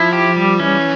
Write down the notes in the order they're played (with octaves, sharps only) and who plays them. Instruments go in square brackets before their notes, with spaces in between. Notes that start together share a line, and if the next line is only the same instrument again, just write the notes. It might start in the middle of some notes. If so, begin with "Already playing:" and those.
Already playing: [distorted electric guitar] F3 [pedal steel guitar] E4
[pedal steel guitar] G4
G3
[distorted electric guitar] E3 [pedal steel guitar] C#4